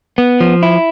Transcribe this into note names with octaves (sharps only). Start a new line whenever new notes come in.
B3
F3
E4